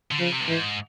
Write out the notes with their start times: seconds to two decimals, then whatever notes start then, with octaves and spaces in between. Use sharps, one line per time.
0.12 D3
0.20 C#3 F3
0.33 C3
0.41 G2
0.47 G#2 E3